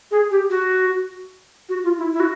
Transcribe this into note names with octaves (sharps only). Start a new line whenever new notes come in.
G#4
G4
F#4
F#4
F4
E4
E4
F#4